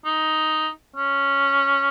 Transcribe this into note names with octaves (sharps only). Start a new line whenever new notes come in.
D#4
C#4